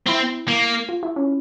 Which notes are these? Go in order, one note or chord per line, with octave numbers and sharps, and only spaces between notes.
C4 E4
A#3
F4
E4
C#4